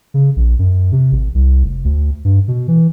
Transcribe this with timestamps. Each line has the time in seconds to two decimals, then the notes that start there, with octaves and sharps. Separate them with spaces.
0.14 C#3
0.36 A#1
0.59 F#2
0.92 C3
1.12 G#1
1.34 C2
1.64 F1
1.84 D2
2.25 G2
2.48 B2
2.68 E3